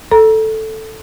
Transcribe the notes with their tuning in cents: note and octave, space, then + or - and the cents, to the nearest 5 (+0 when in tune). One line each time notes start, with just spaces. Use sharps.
A4 +0 A#5 +25